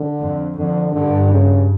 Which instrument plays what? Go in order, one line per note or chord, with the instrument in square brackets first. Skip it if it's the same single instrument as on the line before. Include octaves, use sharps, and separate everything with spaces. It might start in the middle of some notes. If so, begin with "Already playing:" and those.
Already playing: [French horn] D3
[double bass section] F2
[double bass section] F2 [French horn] D3
[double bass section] G2 [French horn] D3
[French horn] C#3